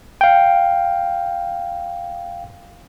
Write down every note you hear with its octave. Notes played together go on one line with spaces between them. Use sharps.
F5 G5